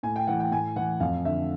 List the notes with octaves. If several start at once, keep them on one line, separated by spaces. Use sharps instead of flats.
A2 G#5
G5
E3 F#5
G5
A2 G#5
E3 F#5
F2 F5
D3 E5